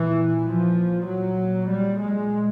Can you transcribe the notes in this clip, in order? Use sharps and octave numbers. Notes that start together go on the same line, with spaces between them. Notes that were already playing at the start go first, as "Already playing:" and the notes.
Already playing: A#2 E3
F3
A#2 F#3
G3
G#3